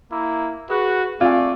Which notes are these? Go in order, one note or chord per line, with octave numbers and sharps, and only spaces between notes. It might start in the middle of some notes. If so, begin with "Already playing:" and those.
A#3 E4
F#4 G#4 B4
A3 C4 F4 D5 G#5